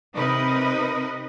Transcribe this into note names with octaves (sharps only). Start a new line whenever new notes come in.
C3 D#4 A#4 B4 D#5